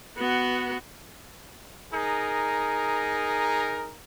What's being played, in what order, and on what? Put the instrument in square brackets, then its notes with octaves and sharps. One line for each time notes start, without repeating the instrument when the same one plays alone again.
[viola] B3 F#4
[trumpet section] D#4 G#4 A#4